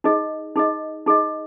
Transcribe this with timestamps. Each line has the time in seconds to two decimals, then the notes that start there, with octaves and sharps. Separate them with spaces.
0.04 D#4 G#4 D#5
0.56 D#4 G#4 D#5
1.06 D#4 G#4 D#5